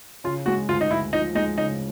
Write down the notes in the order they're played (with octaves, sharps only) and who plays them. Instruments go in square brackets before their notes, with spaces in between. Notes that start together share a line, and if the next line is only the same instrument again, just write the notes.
[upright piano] C#3 [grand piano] F4
[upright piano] G#3 [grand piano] F#4
[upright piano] D2 [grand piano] F4
[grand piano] D#4
[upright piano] D2 [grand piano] E4
[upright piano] F3 [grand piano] D#4
[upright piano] G#3 [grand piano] D#4
[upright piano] C#3 [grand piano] D#4